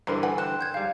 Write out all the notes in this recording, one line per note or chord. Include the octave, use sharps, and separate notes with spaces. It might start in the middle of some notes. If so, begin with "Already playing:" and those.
G2 D3 E3 D4 A#4 C5
B4 F#5 G#5
C4 F#6 E7
G6 G#6
G#2 G3 F5